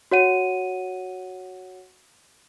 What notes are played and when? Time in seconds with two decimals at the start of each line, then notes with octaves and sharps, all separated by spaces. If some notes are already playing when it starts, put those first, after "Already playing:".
0.11 F#4 C#5 F#5 D#7